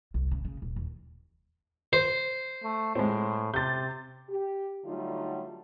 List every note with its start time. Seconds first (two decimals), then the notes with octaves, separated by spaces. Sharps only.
0.14 C2
0.31 C#3
0.45 C#3
0.62 D#1
0.76 D#2
1.93 C5
2.63 A3
2.95 A2 G#3 C4
3.54 C3 G6 A6
4.28 G4
4.84 D3 F#3 G3 A3 D#4 F4